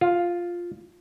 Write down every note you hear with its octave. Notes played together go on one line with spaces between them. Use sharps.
F4